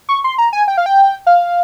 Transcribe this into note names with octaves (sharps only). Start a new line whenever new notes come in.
C#6
C6
A#5
G#5
G5
F5
G5
F5